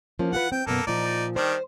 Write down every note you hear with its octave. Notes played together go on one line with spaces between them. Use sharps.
F3 A#3 C#4
F4 G4 B4 F#5
C4 G5
F#2 B2 A#3 B3 A4
A#2 F3 D#4 D5
D#3 G3 D4 C5